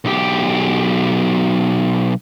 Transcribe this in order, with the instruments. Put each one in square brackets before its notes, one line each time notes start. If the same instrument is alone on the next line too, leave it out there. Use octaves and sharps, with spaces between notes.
[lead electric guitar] B1 G4